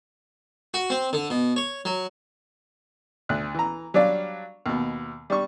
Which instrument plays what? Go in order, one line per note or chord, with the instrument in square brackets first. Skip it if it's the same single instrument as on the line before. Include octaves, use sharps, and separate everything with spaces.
[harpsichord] F#4
C4
D3
B2
C#5
F#3
[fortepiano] D2 F#6
E3 A#5
F#3 G3 D4 D5 F5
D#2 B2
G3 D4 C#6